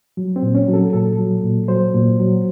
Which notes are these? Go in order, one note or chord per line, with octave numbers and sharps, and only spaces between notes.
F#3
C4
A#2
C#4
F#3
A4
A#2 A4
F#3
A#2
F#3 C5
A#2
F#3